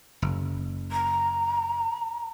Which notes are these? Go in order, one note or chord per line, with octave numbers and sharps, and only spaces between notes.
F#1
A#5